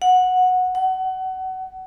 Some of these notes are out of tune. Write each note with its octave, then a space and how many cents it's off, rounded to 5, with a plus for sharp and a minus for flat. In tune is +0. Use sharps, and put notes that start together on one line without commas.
F#5 -10
F#5 +25